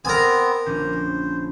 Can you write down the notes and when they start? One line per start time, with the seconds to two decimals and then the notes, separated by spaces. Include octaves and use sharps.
0.05 B3 C4 A#4 G#5
0.66 A#1 D3 C#4 C5